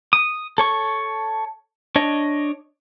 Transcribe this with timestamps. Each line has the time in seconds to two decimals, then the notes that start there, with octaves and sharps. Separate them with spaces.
0.13 D#6
0.58 A4 C#5 C#6
1.96 D4 C#5 D#5